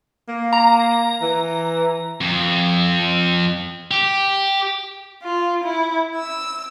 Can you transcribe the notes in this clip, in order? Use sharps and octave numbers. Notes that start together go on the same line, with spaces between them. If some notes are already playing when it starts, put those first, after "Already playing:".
A#3
A#5
E3
F2
G4
F4
E4
E6